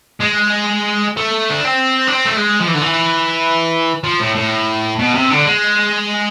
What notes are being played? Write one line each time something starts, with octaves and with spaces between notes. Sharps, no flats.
G#3
A3
D4
C4
D4
C4
A3
G#3
F3
E3
D3
E3
F3
A2
A2
B2
C3
D3
G#3